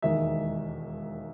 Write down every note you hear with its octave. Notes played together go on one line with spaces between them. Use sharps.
E1 D#2 D#3 G#3 E5